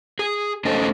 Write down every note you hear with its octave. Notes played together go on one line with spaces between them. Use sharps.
G#4
A3 C#4 D#4 A4 C5 D#5